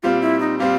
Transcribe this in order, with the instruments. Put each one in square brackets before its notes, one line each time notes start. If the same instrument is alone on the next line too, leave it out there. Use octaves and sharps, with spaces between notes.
[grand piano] A#2 G3 C4 [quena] F4
[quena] E4
D#4
[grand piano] A#2 G3 C4 [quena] F4